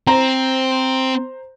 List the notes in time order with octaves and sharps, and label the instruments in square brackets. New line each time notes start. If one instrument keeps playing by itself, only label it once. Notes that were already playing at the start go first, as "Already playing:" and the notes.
[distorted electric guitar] C4 [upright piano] C5 A#5